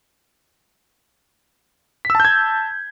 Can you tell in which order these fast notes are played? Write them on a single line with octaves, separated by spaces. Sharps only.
B6 E6 A5 G6 G#6